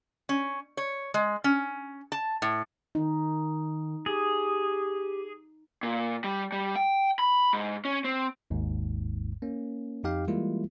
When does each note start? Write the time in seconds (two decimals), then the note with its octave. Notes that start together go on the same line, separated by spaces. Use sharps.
0.29 C#4
0.77 C#5
1.14 G#3
1.44 C#4
2.12 A5
2.42 A2
2.95 D#3 D#4
4.06 G4 G#4
5.83 A#2
6.24 G3
6.52 G3
6.76 G5
7.19 B5
7.53 G#2
7.85 C#4
8.05 C4
8.50 G#1 D#2 G#2
9.42 A#3 C#4
10.04 F2 D#4 G4 F5 G5
10.28 E3 G3 G#3 A#3 E4 F4